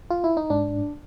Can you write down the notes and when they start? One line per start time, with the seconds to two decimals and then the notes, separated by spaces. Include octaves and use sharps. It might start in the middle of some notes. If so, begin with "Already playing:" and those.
0.10 F4
0.24 E4
0.37 D#4
0.50 G#2 D4